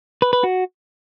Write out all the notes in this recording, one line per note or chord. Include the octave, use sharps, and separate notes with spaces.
B4
B4
F#4